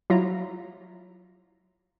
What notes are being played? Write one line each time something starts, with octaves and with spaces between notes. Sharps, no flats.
F#3 E4 F4 A#5